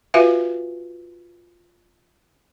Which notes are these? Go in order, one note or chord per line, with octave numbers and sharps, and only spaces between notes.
F4 F#4 B4 E5 F5 G#5